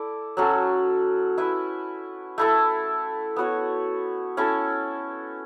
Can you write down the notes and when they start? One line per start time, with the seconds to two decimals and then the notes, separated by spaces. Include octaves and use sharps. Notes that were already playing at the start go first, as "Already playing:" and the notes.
Already playing: E4 A4 D5
0.37 F#3 C#4 F#4 A4
1.38 E4 B4 E5
2.38 A3 E4 A4
3.36 B3 F#4 C#5
4.37 C#4 E4 A4